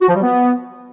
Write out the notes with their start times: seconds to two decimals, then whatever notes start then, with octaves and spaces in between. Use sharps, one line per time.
0.02 F#4
0.09 F3
0.15 G3
0.22 B3